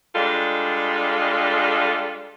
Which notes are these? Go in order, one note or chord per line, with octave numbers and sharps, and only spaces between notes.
G3 G#3 D4 F4 A4